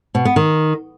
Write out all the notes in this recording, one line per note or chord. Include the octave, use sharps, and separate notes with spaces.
B2
B3
D#3